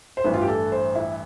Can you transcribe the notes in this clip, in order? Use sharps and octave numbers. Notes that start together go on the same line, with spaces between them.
C5
A1 G2 E3 B4
F4
G4
A4
C5
E4